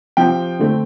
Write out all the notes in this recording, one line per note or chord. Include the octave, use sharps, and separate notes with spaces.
C3 F3 C4 G5
D3 A3 C4